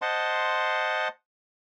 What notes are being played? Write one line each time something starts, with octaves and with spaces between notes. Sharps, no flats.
C5 D#5 F#5 A5 C6